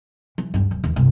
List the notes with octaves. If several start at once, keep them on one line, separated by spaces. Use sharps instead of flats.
E3
D2 G2
D1
D#2 E3
G1 C2